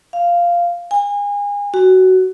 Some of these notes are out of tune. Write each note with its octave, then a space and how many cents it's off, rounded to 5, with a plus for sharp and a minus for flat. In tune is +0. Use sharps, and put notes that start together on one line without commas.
F5 -10
G#5 -30
F#4 +15